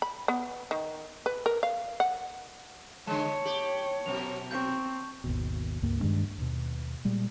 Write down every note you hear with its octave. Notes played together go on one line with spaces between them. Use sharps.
B5
B3
D#3
B4
A#4
F5
F#5
D3 G#3 C#5 A5
G4 F#7
F#2 B2 F7
C4 C#6 G6
G#1 D#2 B2
C#2 G2 A#3
G2 D#3 G#3 D4
D#2 B2
A#2 G3 G#3